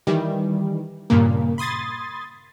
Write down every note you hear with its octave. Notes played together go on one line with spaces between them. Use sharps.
D#3 E3 G3
G2 A#2 C#3 A#3
B5 C6 D#6 G#6 A6